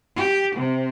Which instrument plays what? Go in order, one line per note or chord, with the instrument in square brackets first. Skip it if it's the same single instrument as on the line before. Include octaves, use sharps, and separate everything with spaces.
[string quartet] G4
C3